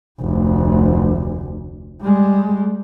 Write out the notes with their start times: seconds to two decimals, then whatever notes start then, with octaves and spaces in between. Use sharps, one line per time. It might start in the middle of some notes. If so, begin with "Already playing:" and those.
0.20 F1 D2
2.02 G3 G#3